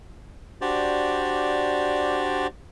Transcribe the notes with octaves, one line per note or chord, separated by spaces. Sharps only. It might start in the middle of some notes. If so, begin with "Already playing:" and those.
D4 F#4 G4 C5 D5